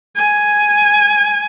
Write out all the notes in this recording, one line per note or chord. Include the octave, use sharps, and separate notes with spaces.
G#5